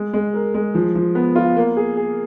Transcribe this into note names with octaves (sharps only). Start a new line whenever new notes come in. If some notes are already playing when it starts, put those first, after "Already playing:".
Already playing: G#3
G#3
A#4
G#3
F3
F3
B3
F4
A#3
G#4
G#4